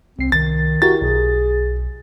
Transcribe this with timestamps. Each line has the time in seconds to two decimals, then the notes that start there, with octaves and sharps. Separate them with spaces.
0.19 C2 C4 C7
0.32 C2 D#3 A6
0.82 E4 F#4 G4 A#4 A6
1.01 B1 G#4